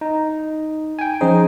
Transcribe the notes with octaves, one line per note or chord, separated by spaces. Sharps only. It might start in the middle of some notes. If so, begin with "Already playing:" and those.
D#4
G5 G#5
F3 C#4 D#4 G#4 C5